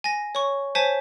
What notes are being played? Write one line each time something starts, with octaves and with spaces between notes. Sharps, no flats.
G#5 A#6
C#5 C#6
C5 C#5 G#5 A5 B6